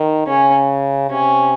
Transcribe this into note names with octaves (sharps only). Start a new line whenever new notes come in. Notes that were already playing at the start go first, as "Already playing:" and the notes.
Already playing: D#3
C#3 C#4
C3 C#4